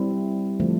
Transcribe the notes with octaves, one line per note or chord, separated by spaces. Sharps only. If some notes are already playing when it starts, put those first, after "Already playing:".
Already playing: G3 C4 E4
D3 F3 A3